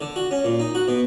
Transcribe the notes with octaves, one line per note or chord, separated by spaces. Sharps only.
D3
F#4
C#4
A#2
D#4
F#4
B2